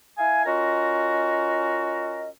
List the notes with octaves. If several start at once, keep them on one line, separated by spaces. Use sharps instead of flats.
E4 F5 G#5
C#4 F4 F#4 A#4 D#5